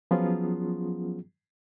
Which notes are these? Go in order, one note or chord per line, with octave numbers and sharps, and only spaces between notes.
F3 F#3 B3 C#4 F4 G#4